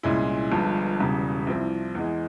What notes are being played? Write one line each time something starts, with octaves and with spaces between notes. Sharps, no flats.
C2 A#2 G#3 C#4 E4
G1 G2 F3 G#3
E1 E2 C#3 G3
C2 C3 F3 C4 E4
E2 E3 G#3